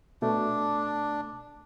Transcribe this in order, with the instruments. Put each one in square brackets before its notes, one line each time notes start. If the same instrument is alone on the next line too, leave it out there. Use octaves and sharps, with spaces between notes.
[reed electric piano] B2 A3 [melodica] D4